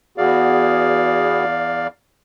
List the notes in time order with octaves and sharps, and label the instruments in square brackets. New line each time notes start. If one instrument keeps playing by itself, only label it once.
[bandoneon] E2 D5 F5 [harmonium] B3 F#4 G#4